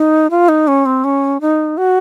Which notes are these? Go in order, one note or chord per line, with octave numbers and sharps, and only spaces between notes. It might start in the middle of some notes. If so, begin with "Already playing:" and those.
Already playing: D#4
F4
D#4
C#4
C4
C#4
D#4
F#4